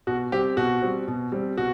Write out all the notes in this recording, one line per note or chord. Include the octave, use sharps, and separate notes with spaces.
B2 F#4
G3 C4 G4
B2 F#4
G3 C4
B2
G3 C4
B2 F#4